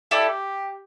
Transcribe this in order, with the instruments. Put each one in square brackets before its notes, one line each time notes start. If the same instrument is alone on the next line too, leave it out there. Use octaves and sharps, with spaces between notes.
[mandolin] E4 A4 D5 [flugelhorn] G4